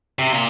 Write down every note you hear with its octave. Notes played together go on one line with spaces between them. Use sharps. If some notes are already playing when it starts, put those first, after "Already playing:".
C3
A#2